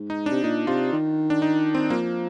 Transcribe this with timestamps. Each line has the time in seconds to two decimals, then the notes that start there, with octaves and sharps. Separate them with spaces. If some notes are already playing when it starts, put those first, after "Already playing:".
Already playing: G#2
0.10 D#4
0.26 D4
0.31 C3
0.43 A#2 D#4
0.67 C3 F4
0.93 D#3
1.30 D4
1.42 D#4
1.75 C4
1.90 F3 A#3